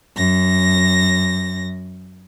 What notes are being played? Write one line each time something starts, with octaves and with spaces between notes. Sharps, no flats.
F#2 A#6